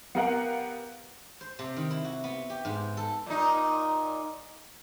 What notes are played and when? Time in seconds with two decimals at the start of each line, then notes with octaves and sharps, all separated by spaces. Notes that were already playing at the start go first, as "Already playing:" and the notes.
0.15 B3 G4 A#4 F5 F#5
1.41 C5
1.59 C3
1.76 D#3
1.91 E4
2.05 F#4
2.24 B3
2.50 G4
2.65 G#2
2.97 A4
3.26 A#2 D#4